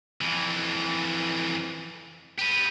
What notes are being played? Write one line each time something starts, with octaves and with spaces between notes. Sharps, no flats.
F2 E3
G4 B4